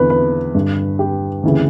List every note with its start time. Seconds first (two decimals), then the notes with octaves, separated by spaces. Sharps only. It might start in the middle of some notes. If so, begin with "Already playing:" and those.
Already playing: E2 D3 B4
0.10 B4
0.55 G2 D3
0.99 G4
1.43 D2 C#3 E3